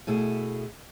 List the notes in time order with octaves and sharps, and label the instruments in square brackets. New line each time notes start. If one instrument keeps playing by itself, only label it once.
[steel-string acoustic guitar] B2 A3 E4 G#4